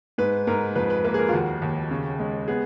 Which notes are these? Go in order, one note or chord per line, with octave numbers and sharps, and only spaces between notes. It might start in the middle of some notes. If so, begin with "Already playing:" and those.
G#2 B4
G#2 A#4
F2 B4
B4
A#3 B4
G#4
A#4
F4
D#2 F#4
D#2
C#3
G#3
B3 G#4